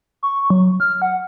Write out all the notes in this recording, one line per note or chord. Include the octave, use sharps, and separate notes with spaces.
C#6
F#3
F6
F#5